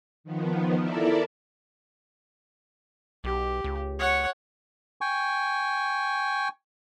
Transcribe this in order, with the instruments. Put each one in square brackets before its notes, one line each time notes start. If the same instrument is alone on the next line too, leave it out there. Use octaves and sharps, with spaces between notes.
[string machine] D#3 F3 B3
E4 A4 A#4 D5 E5
[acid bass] B1 [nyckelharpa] G4
[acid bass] C#2
[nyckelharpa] C#5 F#5
[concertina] G5 G#5 C#6